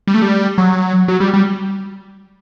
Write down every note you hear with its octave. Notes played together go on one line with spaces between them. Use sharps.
G3
A3
G3
F#3
F#3
G3
G3